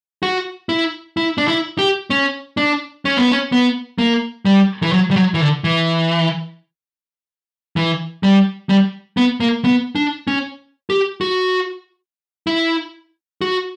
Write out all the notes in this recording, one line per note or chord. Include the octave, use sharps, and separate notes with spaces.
F#4
E4
E4
D4
E4
G4
C#4
D4
C#4
B3
C#4
B3
A#3
G3
E3
F#3
G3
F#3
E3
D3
E3
E3
G3
G3
B3
A#3
B3
D4
C#4
G4
F#4
E4
F#4